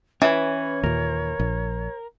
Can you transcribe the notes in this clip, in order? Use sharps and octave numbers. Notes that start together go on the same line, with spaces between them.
E3 C#4 B4 C#5
D#2 A#2 A#4
A#1